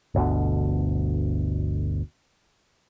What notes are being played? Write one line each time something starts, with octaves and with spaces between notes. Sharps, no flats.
G1 D2 B2 D3